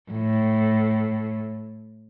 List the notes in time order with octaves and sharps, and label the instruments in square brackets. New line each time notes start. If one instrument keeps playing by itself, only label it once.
[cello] A2